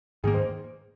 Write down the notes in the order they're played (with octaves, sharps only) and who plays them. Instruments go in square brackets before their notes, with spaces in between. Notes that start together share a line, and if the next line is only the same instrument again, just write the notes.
[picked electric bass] G#2 D#3 A#3 [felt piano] G#4
[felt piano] C5